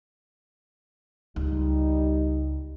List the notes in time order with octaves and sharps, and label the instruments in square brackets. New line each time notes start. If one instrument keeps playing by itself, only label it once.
[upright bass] C#2 [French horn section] G3 D#4